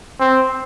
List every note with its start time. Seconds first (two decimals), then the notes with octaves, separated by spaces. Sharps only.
0.20 C4